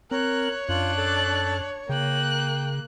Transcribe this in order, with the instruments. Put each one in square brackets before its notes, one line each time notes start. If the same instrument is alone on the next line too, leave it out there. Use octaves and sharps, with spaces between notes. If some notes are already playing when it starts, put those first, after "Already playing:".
[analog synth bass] C4 [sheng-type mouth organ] A#4 [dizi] C#5 [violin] F#6
[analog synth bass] F#2 [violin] D4 F#6 [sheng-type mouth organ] F4
[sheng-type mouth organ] A4 A5
[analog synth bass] C#3 [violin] A#3 F#6 [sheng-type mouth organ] G5